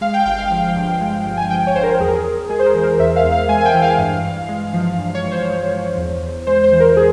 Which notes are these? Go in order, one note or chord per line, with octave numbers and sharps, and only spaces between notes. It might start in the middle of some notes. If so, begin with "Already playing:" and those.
G#3 F5
G5
G1 G5
F5
F3
G2
G#3
G1
G#5
F3 G5
C#5
G2 C5
A#4
E2 G#4
A#4
G#4
E2
G#3 G#4
C5
A#4
E3 C5
A#4
E2 E5
F5
E2
F5
G#3 G#5
G#5
G5
E3
F5
G2
G2
G#3
F3
G2
C#5
G2
C5
G#3
F3
E2
E2
G#3 C5
C5
E3
A#4
G#4